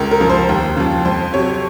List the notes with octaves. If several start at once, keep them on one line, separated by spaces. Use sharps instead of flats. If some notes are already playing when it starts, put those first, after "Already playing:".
Already playing: C#2 A#4
A#4
C#3 F3
C5
D#2
C#3 F3
F2 C5
C3 F#3 C#5